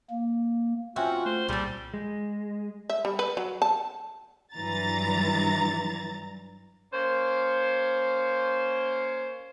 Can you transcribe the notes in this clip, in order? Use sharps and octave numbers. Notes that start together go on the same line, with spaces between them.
A#3
C4 C#4 F4 F#4 E5 G5 G#5
A3 C5
C2 A#2 G3 G#4 A4 C5
G#3
E5
G3
B4
F#3
A5
G2 E3 F#3 A#5 A6
A#3 C#4 C5